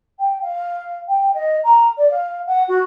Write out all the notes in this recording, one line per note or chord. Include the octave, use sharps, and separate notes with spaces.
G5
F5
G5
D#5
A#5
D5
F5
F#5
F#4